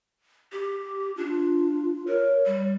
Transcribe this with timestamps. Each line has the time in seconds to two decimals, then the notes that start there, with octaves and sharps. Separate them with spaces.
0.52 G4
1.18 D4 F4
2.08 A#4 C#5
2.46 G3